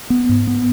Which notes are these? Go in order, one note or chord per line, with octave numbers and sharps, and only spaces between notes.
B3
G#2
B3